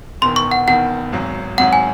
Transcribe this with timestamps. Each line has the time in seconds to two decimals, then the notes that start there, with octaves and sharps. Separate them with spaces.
0.22 E1 E2 D#3 C6
0.36 C#6
0.51 F#5
0.67 E1 E2 D#3 F#5
1.13 G#1 G#2 F#3
1.58 G#1 G#2 F#3 F#5
1.73 G#5